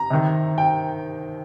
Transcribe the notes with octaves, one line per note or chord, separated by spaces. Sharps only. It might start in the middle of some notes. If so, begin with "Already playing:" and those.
Already playing: A#5
C3 D#3
G5